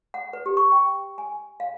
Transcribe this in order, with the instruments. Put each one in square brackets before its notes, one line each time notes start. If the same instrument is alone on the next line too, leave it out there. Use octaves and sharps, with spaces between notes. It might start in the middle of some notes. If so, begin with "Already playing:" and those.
[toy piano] F#5
B4
G4
C#6
G5
G#5
F5